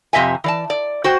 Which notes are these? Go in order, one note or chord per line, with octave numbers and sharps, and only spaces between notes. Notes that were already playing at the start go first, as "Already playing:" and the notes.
F2 C3 D#5 E5 G#5
E3 D5 A5
D5
F#4 C5 G5